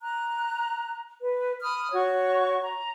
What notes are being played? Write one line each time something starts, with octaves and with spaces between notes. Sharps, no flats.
A#5 F#6
B4
B5 D#6 F6
F#4 C#5 C#6
A#5